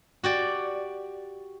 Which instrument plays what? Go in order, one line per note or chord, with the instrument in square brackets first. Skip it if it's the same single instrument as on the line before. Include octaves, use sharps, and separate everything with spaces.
[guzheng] F#4 G4 D5